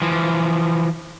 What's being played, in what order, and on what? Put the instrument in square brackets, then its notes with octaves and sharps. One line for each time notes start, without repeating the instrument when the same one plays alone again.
[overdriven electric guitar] E3 F3